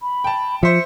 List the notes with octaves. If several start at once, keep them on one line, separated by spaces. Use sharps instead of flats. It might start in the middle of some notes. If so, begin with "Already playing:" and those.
B5
G5 A5
F3 C5 E5 C#7